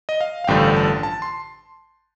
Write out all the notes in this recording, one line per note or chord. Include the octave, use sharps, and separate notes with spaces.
D#5
F5
F5
A1 G2 D3 F3 G5
A5
A5
C6